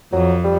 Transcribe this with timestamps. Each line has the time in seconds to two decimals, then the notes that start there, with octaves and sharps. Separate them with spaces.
0.13 F2 F#3
0.44 G3